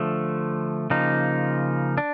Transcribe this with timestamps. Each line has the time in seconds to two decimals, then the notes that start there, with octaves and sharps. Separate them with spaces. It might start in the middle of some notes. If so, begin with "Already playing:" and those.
Already playing: D3 F3 A3
0.90 C#3 F3 A#3 D#4
1.98 D4